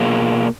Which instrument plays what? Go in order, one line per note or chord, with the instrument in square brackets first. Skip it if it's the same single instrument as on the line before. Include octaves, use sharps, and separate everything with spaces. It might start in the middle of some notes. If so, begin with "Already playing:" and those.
Already playing: [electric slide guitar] B2 A#3 F4 G#4